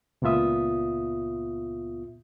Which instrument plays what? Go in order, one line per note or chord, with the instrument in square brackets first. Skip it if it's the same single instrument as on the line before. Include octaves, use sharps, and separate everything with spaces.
[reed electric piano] C#2 A#2 B3 F4 E5 D#6